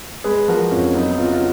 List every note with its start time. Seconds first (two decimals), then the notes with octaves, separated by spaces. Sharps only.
0.24 G#3 G#4 B4
0.48 F3 F#4 A#4
0.71 F2 C#4 F4
0.94 F#3 B3 D#4
1.18 C#3 F4
1.26 F#4
1.33 C#4 F4